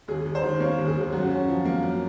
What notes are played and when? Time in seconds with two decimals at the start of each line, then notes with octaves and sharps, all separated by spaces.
0.08 D#2 G#4
0.25 D#2
0.35 C5
0.43 D#3
0.60 A#3 C#5
0.78 D#2
0.87 G#4
0.96 D#2
1.13 F#2 F#4
1.30 C#4
1.48 F3
1.65 A#3
1.83 F#2